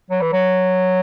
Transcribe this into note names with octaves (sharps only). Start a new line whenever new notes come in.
F#3
E3
F#3